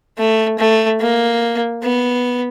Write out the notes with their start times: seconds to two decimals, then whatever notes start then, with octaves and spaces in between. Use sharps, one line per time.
0.18 A3
0.58 A3
1.00 A#3
1.82 B3